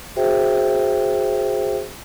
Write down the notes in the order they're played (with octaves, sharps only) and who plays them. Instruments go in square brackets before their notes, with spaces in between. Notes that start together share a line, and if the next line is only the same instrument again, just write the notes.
[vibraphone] F#4 G#4 C5 E5 G5